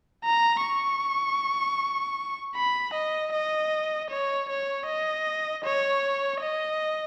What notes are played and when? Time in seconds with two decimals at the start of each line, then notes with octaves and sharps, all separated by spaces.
0.24 A#5
0.63 C#6
2.55 B5
2.94 D#5
3.33 D#5
4.10 C#5
4.49 C#5
4.86 D#5
5.65 C#5
6.41 D#5